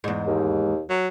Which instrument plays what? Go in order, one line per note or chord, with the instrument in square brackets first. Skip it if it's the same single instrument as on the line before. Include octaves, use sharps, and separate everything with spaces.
[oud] E2 G#2
[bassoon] D#2
[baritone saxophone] F#3